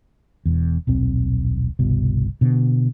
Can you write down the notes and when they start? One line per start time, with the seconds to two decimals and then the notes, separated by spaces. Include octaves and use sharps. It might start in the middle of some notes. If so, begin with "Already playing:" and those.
0.46 E1 E2
0.87 D#1 B1 C4
1.79 G1 C2 B2
2.41 B2 D3